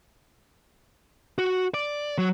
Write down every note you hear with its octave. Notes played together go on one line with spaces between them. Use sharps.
F#4
D5
F#3